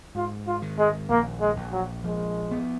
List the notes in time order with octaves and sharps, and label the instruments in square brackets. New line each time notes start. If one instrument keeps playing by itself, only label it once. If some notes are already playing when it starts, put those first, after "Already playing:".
[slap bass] G#2 [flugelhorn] F4
[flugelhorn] F4
[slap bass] D#3
[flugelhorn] G#3
[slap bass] A#1 [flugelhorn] A#3
[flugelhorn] G#3
[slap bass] A#1
[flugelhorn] F#3
[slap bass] F3 [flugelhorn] G#3
[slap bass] B3